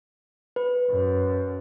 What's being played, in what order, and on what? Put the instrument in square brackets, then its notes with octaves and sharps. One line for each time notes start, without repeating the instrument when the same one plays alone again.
[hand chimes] B4
[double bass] F#2